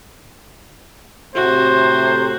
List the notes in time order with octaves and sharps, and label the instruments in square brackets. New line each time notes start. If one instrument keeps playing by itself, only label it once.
[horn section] A2 C3 C5 [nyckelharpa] F#4